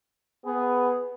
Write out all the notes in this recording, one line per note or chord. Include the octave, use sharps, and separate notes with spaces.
B3 G#4